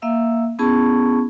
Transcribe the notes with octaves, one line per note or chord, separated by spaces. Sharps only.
A#3 E5 F5 E6
B3 C#4 E4 G#4 A5 C#6